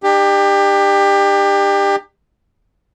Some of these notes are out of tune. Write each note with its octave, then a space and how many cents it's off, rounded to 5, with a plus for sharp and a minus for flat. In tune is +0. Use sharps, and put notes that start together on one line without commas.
D4 +45 G4 +25